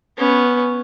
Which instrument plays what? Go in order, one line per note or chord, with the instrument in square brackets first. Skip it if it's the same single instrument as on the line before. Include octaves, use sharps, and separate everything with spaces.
[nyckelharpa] B3 C#4